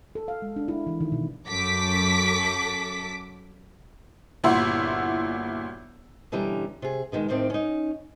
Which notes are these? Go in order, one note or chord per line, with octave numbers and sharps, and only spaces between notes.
A4
F5
G#3
D4
E4
E3
D#3
B2
F#2 A4 D6 B6
G1 A#2 E4 F#4 E5 C6
B2 D3 E3 G3 C#4 A#5
C3 G#4
B2 D3 D#3 G#3
D2 A2 D#3 C4 D5
C#4 D#4